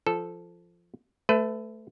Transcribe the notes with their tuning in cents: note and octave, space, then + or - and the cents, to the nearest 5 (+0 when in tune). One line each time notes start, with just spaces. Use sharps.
F3 -15 A4 -10
A3 -5 B4 +30